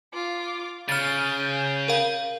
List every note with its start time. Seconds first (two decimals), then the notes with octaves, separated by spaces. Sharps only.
0.14 F4 D6
0.89 C#3 F6 G6 A6
1.88 A#4 F5